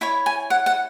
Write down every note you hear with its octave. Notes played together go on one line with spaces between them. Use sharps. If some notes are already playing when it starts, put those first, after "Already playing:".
E4 C#5 B5
G#5
F#5
F#5